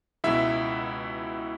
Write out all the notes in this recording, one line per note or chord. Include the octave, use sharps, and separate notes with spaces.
C#2 B2 G#3 E4 E5